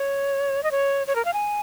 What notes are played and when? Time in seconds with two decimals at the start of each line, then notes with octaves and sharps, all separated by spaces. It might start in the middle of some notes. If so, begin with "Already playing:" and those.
Already playing: C#5
0.63 D#5
0.71 C#5
1.07 C#5
1.16 A#4
1.25 F5
1.34 G#5